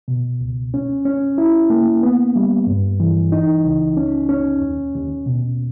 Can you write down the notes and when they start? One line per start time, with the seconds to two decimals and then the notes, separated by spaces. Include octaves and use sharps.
0.08 B2
0.41 C#2
0.74 C#4
1.05 C#4
1.38 E4
1.70 A#3
2.03 B3
2.36 G3
2.67 G2
3.00 E3
3.32 D#4
3.65 C#2
3.97 C#4
4.29 C#4
4.62 D#2
4.95 D#2
5.26 B2